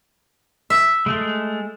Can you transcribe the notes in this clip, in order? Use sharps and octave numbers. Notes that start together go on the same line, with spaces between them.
E5
G#3 A3